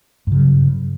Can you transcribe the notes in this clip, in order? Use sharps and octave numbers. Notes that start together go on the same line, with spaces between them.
G2 C#3 F#3